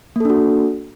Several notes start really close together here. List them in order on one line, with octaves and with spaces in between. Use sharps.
A#3 A4 D4 F#4